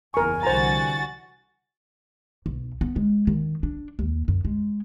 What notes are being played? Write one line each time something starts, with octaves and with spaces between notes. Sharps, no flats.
F#1 E2 A#4 G#5 C#6
C2 D3 E3 F#4 C5 A#5 A6
B1
B3
G#3
D#3
D4
D#2
F#2
G#3